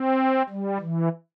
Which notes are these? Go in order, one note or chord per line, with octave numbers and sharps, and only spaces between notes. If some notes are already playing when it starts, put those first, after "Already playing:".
Already playing: C4
G3
E3